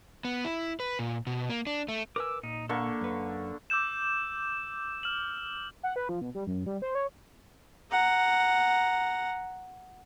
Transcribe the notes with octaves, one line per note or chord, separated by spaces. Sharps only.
B3
E4
B4
A#2
B2
A#3
D4
A3
A#4 B4 G#5 D6 E6
A#2 D#4
D3 A#3 A4 C#6
F#2 B4
D6 E6 G6 E7
F6 E7 F#7
F#5
B4
F3
B2
G3
F#2
G3
C5
C#5
F#5 A#5